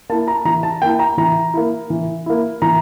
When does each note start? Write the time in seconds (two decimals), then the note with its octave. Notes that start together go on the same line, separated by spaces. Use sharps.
0.09 A#3 E4 A5
0.28 A#5
0.45 E3 A#5
0.63 A5
0.82 A#3 E4 G5
0.99 A#5
1.18 E3 A#5
1.54 A#3 E4
1.90 E3
2.26 A#3 E4
2.62 E3 A#5